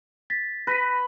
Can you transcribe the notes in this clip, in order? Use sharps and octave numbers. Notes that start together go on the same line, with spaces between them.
A6 B6
B4 A#6 B6 D#7